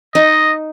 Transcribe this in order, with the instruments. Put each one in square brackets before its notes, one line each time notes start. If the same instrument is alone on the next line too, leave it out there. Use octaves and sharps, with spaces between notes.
[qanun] D#4 [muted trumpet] D#5